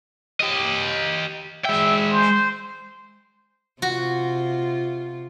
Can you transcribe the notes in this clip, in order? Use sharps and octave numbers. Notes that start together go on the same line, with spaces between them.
G4 D#5
G#3 E5 G5
C5
C3 F4 F#4